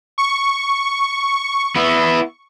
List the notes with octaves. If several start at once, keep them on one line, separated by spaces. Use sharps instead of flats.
C#6
B3 E4